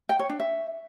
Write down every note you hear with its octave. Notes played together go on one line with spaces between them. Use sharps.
G5
C#5
D4
E5